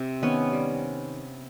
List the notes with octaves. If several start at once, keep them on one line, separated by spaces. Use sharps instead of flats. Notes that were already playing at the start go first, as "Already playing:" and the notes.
Already playing: C3 C4
D#3 B3 C#4
G3